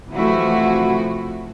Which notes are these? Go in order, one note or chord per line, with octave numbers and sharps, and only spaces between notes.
C3 E3 F3 A3 E4 F#4